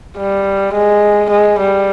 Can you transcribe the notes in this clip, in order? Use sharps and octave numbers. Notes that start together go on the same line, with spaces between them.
G3
G#3
G#3
G3